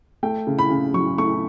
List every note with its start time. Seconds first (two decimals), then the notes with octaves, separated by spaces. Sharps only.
0.23 A3 G5
0.47 C#3
0.59 B5
0.70 C#3
0.94 F#3 C#6
1.18 A3 C#6